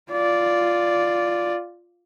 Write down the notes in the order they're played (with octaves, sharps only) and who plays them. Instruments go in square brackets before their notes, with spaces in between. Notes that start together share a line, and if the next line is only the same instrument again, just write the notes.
[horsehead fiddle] F4 D5